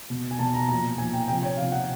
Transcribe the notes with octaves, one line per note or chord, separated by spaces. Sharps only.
B2
G#5
B2 A5
A#5
A#2 F3 A#5
A#2 F3 G#5
G5
C3 F3 G5
C#5
C3 F3 F5
F#5